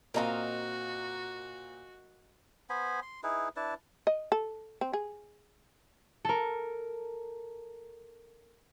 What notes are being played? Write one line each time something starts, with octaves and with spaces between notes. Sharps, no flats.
A#2 C4 F#4 A#4 D#5 F5 A#5
B3 C5 G#5 B5
C6
D#4 E4 G#4 B4
D4 E4 B4 A5
D#5
A4
C4
G#4
A4 A#4